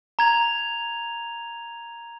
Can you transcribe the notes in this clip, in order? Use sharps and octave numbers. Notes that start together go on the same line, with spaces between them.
A#5 G#6 F7